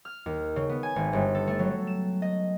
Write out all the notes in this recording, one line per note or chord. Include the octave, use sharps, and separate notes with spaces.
F6
D#2
C#3
B3
G#5
G#1
G1
A4
A3
F#3
E7
D#5